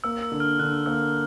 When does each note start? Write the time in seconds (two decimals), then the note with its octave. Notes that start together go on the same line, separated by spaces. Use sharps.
0.04 A#3 E6
0.23 E6
0.32 D3
0.40 F6
0.59 D3 F#6
0.86 A#3 E6